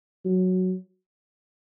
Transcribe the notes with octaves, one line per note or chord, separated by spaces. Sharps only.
F#3